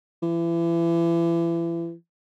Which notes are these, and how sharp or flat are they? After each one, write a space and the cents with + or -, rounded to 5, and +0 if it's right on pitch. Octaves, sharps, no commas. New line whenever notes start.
E3 +35